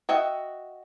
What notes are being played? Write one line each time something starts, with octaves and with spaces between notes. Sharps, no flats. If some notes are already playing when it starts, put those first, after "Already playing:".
F#4 D#5 E5 G5